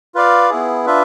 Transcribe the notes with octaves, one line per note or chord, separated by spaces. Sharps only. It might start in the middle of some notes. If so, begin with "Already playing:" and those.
F4 B4 D5 F5
B3 E4 G#4
D4 F4 B4 E5